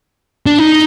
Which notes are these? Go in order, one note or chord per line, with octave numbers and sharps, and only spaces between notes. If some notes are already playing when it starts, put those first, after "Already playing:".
D4
D#4